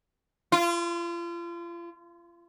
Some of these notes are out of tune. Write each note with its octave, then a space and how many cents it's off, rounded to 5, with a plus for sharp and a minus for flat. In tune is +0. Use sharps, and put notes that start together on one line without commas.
F4 -35